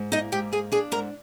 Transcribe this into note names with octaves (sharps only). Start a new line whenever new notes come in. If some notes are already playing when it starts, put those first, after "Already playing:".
Already playing: G#2
A#3 D#4 D#5
G#2 G4 G5
A#3 G#4 G#5
D4 G#4 G#5
G#2 A#4 A#5